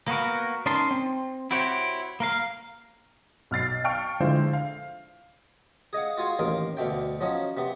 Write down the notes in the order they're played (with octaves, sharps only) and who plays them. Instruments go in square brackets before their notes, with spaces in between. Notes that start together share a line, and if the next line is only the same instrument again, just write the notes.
[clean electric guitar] A#3 B3 F#4 A#4
C#4 D#4 A#4 D#5 A5 C6
C4
E4 F#4 G4 C5 C#5
A#3 A#4 F5
[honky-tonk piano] B1 F6 A6 C7
F5 G5 A5 C#6 F6 D7
D3 F3 G#3 E4 C5 F5
F5
[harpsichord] G#4 D#5 F5 F#5
F4 F#4 G#4 F5 G#5 C6
A1 D#2 A#4 D#5 F5 C6
D2 B2 A3 G5
F3 F#3 C#4 D#5
C3 B3